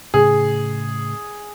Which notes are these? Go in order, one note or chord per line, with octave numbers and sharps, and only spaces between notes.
A2 C#3 G#4